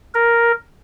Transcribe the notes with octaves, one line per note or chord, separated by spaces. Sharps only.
A#4